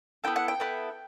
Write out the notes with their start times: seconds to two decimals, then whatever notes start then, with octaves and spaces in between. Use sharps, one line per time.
0.24 B3 E4 A4 G5
0.36 F#5
0.48 G5
0.60 B3 E4 A4